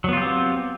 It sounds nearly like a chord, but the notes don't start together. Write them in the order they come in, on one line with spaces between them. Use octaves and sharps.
F#3 B3 F4 G4 C4